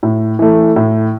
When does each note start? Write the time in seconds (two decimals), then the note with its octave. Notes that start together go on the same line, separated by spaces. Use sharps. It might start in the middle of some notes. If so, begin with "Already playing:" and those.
0.03 A2
0.39 E3 A3
0.76 A2